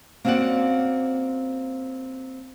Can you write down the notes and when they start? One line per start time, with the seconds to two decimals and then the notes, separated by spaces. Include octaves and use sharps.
0.25 A#3 C4 C#4 F#4 D5 F#5